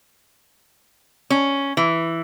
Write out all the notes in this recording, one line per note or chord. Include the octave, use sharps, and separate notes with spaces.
C#4
E3